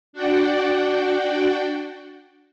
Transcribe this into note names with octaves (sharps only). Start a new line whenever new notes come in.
D4 F#4 D5 F#5 G5